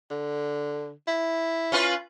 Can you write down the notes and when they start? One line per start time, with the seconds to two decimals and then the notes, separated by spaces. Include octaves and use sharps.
0.11 D3
1.07 E4
1.72 C#4 F4 B4